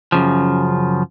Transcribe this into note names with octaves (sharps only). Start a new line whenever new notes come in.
F#2 C#3 F3